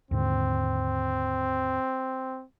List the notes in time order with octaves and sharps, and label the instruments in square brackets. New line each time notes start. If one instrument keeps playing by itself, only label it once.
[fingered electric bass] D#2 G#2 D3 [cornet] C4